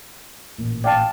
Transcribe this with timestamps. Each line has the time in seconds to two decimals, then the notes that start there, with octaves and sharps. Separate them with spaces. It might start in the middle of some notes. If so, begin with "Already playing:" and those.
0.58 A1 A#2
0.84 D5 F5 G5 A5